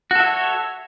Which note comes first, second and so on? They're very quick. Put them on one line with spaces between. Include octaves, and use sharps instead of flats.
F#4 A4 E5 C#5